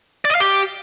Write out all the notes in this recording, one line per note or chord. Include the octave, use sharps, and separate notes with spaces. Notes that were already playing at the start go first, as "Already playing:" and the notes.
D5
D#5
F5
G4